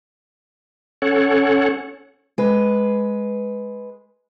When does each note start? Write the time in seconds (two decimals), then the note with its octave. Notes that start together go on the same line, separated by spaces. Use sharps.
1.02 C#4 A4 C#5 F#5
2.38 G#3 B4